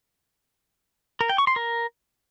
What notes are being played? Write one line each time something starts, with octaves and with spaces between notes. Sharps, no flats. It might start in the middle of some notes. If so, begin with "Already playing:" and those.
A#4
G5
C#6
C6
A#4